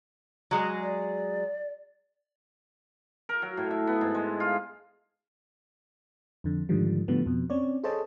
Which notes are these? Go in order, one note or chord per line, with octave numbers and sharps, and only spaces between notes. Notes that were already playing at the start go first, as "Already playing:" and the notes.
F#3 G#3 G#4
D5
A#4
F#3
A2
E5
B3
G#2
G#3
F4
F2 D3
G#2 D3 D#3 F3 G3
A2 D3 F3 G3 B3
F2 B2
C4 C#4 C#5 D5
G#4 A4 C5 C#5 D#5 A5